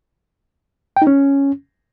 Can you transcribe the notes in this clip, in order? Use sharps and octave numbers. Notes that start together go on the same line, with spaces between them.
G5
D#4
C#4